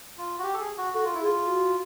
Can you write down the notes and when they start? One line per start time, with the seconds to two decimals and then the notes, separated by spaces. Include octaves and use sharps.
0.18 F4
0.39 F#4
0.43 G4
0.54 A4
0.60 G#4
0.77 F#4
0.94 F#4 A4
1.05 F4
1.15 E4
1.21 G#4
1.24 F4
1.46 F#4